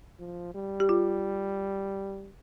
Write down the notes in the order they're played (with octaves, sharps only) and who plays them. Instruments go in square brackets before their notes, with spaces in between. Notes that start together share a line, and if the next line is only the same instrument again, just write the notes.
[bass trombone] F3
G3
[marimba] G4
F4